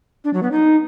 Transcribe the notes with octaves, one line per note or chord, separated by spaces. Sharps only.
D4
F#3
B3
D#4